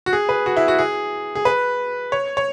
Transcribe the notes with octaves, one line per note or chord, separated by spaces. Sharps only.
F#4
G#4
B4
F#4
E4
F#4
G#4
G#4
B4
C#5
C#5